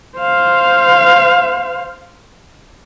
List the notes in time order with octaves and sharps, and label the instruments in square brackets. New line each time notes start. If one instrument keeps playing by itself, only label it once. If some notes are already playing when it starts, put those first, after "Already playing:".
[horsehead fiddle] C5 F5